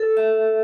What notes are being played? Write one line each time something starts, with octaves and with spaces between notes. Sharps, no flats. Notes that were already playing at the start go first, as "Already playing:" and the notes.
Already playing: A4
E5